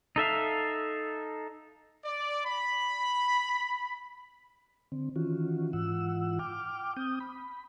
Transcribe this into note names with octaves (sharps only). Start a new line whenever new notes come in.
D#4 A4 E5 F5
D5
B5
D3 C4
D#3 E3 C#4 F4 F#4
G#2 E3 F4 F#5 E6
G5 D6 F6
C4 D#6 G6
B5